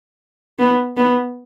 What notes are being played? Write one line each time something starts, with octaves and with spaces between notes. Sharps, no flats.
B3
B3